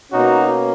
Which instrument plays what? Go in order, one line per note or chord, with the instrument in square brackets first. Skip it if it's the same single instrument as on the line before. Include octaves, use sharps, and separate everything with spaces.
[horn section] B2 A#3 C#4 D#4 F#4